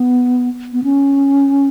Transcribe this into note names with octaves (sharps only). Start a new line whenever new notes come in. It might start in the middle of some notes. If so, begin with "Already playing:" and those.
Already playing: B3
B3
C#4